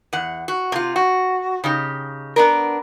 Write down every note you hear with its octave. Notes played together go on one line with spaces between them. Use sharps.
E2 F#5
F#4
C3 F4
F#4
C#3 D#4 G4
B3 D4 A#4